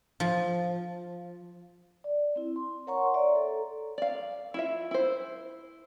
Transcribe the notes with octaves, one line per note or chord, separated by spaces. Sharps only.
F3
D5
C4 E4
C6
A#4 C#5 F#5 A#5 C6 C#6
C#5 D5 E5 A#5
A4
D5 F5
E4 F4 E5
E4 C5